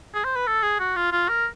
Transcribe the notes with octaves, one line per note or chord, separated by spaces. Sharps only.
G#4
C5
B4
A4
G#4
F#4
F4
F4
A#4